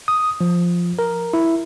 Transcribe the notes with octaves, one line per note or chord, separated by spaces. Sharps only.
D#6
F3
A#4
E4